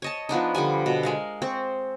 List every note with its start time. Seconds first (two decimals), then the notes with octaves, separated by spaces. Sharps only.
0.02 C#5 D#5 A5
0.29 F3 B3 D4 D#4
0.55 D3 F3 G3 G#5
0.86 B2
1.03 G#3 A#4 F5
1.42 C4 C5 C#6